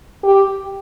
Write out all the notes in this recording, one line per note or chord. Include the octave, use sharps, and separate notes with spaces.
G4